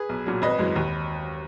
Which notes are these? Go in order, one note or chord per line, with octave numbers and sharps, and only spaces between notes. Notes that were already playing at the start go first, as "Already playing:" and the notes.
Already playing: G#4 B4
B1
A#2 F#3
G#1 B4 D#5
F#2 E3 G#3
D#2